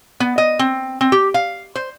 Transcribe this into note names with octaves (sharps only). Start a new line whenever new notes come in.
B3
D#5
C4
C4
G4
F5
C5